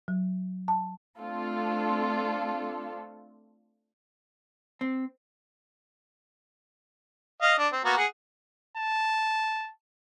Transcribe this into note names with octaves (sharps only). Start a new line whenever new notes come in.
F#3
A5
A3 C4 D4 F4 A4
C4
D#5 F5
D4
C4
A#3 B3 F#4
G#4 F#5
A5